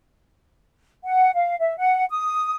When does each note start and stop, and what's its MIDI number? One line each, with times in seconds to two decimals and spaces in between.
1.05 1.31 78
1.35 1.55 77
1.59 1.77 76
1.78 2.05 78
2.11 2.56 87